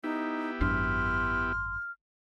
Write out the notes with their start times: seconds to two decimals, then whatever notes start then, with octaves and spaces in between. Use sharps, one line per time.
0.04 B3 D#4 E4 G4
0.61 G#1 F#2 D4 C6 F6